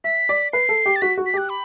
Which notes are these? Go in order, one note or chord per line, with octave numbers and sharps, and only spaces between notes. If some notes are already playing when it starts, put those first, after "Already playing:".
E5 B6
D5
B4 C7
A4
G4
A6
F#4 B6
F#4
B6
G4 F#6
B5